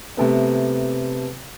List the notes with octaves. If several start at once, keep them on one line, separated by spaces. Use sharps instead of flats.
C3 A3 B3